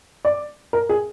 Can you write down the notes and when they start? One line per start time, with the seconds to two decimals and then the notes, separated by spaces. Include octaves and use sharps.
0.25 D5
0.73 A#4
0.89 G#4